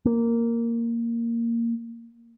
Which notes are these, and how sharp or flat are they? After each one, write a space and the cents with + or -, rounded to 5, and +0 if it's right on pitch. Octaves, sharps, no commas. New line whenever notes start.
A#3 -5